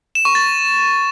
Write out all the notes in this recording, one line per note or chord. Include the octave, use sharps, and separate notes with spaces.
E7
C#6
A6